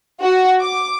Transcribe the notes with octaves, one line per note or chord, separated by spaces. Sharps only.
F#4
D6